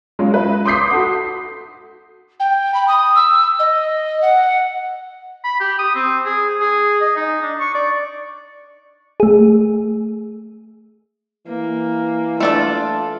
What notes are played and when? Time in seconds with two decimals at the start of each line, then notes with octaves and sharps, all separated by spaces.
0.19 G#3 C#4 F4
0.34 B4 E5
0.65 C6 D6 D#6 G6 B6 C7
0.91 F#4 A4 F#5
2.40 G5
2.74 B5
2.88 D#6
3.15 E6
3.59 D#5
4.22 F#5
5.44 B5
5.60 G4
5.79 D#6
5.95 C4
6.25 G#4
6.61 G#4
7.01 D#5
7.16 D#4
7.42 D4
7.60 C#6
7.75 D5
9.20 A3 G#4
11.47 E3 A#3
12.40 A3 D4 F4 A4